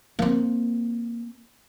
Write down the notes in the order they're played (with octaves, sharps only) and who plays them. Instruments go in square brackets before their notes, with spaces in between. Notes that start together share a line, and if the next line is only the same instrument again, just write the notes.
[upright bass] A#3 C4